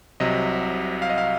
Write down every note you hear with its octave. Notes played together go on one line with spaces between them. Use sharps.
C2 C3 F#3 D#5
F5
D#5
F5